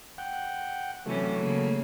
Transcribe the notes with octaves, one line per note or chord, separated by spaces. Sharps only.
F#5 G5
C3 E3 F#3 A3 C#4
C#3 A#3